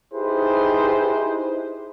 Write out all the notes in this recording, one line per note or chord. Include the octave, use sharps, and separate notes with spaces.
D#4 E4 G4 G#4 B4 C5